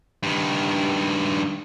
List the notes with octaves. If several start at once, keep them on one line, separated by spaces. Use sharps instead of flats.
G2 D#3